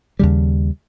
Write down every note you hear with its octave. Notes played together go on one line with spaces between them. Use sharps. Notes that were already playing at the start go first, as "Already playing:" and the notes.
D#2 C#3 G3